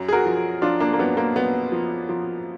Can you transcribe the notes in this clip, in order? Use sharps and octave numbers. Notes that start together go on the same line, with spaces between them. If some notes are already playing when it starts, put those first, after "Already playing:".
Already playing: F#2
G#4
F#4 A#4
F3
F3 D4 F4
A#3 D4
A#3
F#2 B3
A#3
F#2 B3
F3
F3